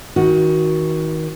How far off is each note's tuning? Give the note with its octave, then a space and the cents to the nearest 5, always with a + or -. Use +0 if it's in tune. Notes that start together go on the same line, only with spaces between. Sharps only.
D#3 +30 F#4 +0